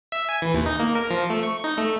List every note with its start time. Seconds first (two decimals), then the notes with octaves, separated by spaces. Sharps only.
0.12 E5
0.29 G#5
0.42 E3
0.54 D#2
0.66 D#4
0.79 A#3
0.95 A#4
1.11 F3
1.30 A3
1.43 C#6
1.64 D#4
1.78 A3